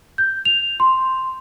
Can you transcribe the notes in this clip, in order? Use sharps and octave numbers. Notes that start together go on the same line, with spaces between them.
G6
F7
C6